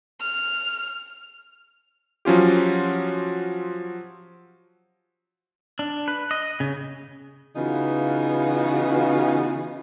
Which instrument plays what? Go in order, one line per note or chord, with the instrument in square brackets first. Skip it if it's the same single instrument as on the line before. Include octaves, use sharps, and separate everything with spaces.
[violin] F6
[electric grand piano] F3 F#3 C#4 F4 G4
[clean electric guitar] D4
B4
D#5
C#3
[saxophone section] C#3 E3 B3 D#4 F4 F#4